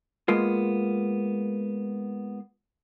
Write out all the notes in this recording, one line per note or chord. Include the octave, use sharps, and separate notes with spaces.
G#3 A#3 B3 F4